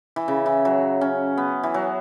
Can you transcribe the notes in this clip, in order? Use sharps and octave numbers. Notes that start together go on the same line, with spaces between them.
E3
C#3
E3
F#3
C#4
B3
E3
F#3